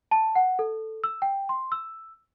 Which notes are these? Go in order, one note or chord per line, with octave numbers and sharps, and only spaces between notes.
A5
F#5
A4
E6
G5
C6
E6